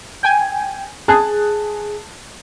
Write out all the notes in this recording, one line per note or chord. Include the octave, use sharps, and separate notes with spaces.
G5 G#5
G#4 A5 F#6